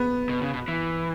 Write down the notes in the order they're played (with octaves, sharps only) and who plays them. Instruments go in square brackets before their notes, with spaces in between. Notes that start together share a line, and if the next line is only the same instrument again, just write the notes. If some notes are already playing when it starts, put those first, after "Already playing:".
Already playing: [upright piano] B3
[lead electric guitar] B2
C#3
B2
E3